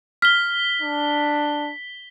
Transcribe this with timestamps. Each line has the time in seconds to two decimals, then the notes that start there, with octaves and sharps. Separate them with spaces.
0.22 F6 B6 G7
0.82 D4